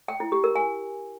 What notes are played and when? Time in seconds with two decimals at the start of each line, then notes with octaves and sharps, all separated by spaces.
0.08 G5
0.20 E4
0.32 G4
0.44 A#4
0.56 G#5